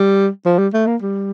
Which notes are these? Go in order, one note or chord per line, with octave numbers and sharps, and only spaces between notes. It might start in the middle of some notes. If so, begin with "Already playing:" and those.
Already playing: G3
F3
G3
A3
A#3
G3